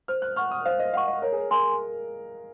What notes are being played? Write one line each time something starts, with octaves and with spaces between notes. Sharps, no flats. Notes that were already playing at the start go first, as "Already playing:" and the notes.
C5 F6
F#6
F#5 C#6 F6
D#6
C5 F5
D#5
F5 F#5 C#6
D#5
A#4 C#5
G#4
A#4
A#4 G#5 C6